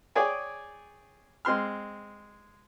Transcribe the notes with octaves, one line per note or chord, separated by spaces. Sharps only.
G#4 C#5 D5 G5 G#5
G#3 C4 C6 F6